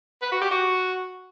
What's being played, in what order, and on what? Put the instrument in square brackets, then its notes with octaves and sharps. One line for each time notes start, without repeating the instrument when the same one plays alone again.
[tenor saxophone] B4
F#4
G4
F#4